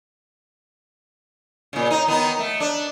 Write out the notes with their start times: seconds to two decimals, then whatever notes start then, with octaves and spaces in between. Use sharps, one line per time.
1.73 A#2 C#3
1.90 D#4
2.07 D#3 B3 D#4
2.39 A3
2.60 D4